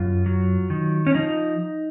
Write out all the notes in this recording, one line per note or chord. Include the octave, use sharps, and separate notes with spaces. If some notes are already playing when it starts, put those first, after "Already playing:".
Already playing: F#2 F4
F#3
D#3
C#4
F3 D#4